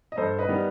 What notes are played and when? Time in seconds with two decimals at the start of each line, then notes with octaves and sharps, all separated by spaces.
0.12 D#5
0.17 G2 A4 C5
0.39 B4 D#5
0.49 D#3 G3 B3